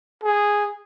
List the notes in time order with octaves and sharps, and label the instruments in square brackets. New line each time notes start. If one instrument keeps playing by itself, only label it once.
[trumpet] G#4